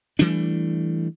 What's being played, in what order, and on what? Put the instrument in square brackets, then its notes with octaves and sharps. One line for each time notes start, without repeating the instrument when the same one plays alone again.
[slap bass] E3 G3 A3 D4